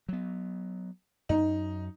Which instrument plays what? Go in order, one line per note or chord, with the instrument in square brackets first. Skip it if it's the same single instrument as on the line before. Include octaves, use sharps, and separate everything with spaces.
[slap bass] F#3 B3
[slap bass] F#2 [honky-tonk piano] D#4